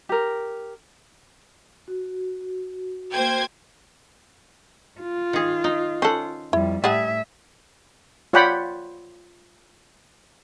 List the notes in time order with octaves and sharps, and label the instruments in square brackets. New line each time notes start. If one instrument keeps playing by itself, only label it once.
[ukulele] G4 A#4
[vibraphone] F#4
[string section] A#3 C5 G#6 [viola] G5
[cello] F4
[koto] D#3 G#4
D#4
[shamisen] C#4 A4 [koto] C5 F#5
[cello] F2 G3 [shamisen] E4
[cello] A2 E5 [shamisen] G3 F#5 [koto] G#4 G#5 A5
[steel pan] F4 C#5 D5 F#5 G5 B5